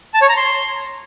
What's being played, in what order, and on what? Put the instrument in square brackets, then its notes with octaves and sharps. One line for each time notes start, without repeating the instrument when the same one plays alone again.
[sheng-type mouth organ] A5
C#5
A#5
C6